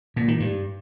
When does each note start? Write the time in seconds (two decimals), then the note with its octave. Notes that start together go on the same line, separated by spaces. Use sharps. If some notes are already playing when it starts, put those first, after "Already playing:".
0.16 A#2
0.28 D#3
0.40 G2